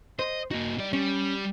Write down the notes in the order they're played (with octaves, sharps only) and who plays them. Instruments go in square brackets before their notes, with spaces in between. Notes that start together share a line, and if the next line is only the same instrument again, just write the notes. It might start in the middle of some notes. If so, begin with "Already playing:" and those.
[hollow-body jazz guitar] C5 [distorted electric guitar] D#5
[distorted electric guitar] A#3 F#4 [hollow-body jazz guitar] D#4
[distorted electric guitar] G3 D5
[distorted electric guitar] G3 [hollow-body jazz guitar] C#4